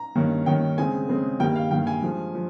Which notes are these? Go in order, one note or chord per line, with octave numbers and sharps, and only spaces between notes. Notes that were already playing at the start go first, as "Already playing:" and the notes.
Already playing: A#5
G2 D#3 A#3 C#4
G2 D#3 A#3 C#4 G5
C#3 G#3 C4 G#5
C#3 G#3 C4
G2 D#3 G3 A#3 G5
F5
G2 D#3 G3 A#3 G5
G#5
G2 F3 G#3
F3